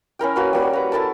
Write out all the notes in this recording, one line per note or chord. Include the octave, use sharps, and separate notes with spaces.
C#4 E4 A#4 G5
A#3 F#4 B4
G3 A#3 F#4
B4 A#5
E4 A4 A#4 A5